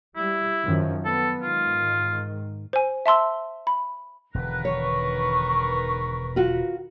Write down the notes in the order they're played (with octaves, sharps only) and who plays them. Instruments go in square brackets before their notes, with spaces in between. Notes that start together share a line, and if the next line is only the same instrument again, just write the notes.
[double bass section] G3 [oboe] E4
[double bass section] F#2 D#3 F3
[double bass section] B3 [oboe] A4
[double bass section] G#2 D#3 [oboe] F4
[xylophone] C5 G#5
E5 A5 C6 E6
B5
[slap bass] E1 D3 [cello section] D#3 A#4 B4 [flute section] F#6
[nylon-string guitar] C#5 [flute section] C#6
[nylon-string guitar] F4 F#4